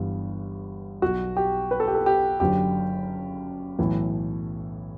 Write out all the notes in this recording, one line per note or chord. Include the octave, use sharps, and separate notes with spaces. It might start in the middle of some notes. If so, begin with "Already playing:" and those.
Already playing: G1 G2 E3
B1 B2 F#4
G4
B4
A4
G4
A4
G4
F#1 F#2 D3 G4
B1 A2 E3